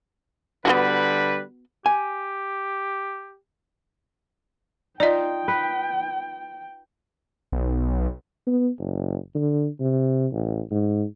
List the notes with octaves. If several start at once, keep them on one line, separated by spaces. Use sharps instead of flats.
D3 G3 B3 F4 F#4 B4
G4 G#5
D#4 F4 D5 D#5 G5
B4
B1
B3
F#1
D3
C3
A1
G#2